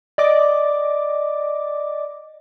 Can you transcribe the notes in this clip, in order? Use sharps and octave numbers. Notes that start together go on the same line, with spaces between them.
D5 D#5 D6